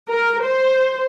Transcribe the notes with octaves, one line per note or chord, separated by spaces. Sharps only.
A#4
C5